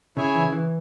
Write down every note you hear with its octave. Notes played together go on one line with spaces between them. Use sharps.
C#3 E4 G#4 C#5 E5 G#5
E3
C#3
E3